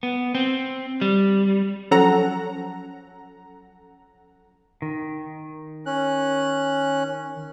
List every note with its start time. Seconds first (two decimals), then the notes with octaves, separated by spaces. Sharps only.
0.03 B3
0.35 C4
1.01 G3
1.91 F3 F#3 C#4 A4 F#5 A#5
4.82 D#3
5.86 C#4 F#6